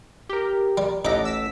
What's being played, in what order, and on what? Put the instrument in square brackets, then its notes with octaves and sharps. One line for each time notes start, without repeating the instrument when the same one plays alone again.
[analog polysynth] G4 A#4
[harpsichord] G3
[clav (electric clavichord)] A1 A4 F#5 [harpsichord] D#4 E5 [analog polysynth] D6 A#6
[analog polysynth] E6 B6